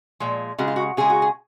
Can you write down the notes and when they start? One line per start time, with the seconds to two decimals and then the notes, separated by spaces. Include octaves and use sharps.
0.20 A#2 F3 G#3
0.58 C#3 G#3 F#4
0.68 F4
0.76 F#4
0.97 C#3 G#3 G#4
1.10 F#4
1.22 G#4